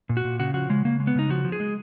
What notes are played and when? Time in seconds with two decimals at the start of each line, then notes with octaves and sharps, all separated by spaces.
0.09 A#2
0.17 F#4
0.24 A#2
0.39 C#3 F#4
0.54 F3 F#4
0.69 C#3 G#3
0.85 C#3 A#3
1.00 G#3
1.07 B3
1.15 C#3 D#4
1.29 F3 F#4
1.45 F3
1.52 G#4
1.60 G#3